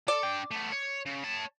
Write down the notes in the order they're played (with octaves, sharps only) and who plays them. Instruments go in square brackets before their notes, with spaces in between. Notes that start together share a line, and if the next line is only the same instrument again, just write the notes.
[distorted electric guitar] A4 [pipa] D5
[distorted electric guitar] D4 G5
A3 B3
C#5
C#3
C#5 A5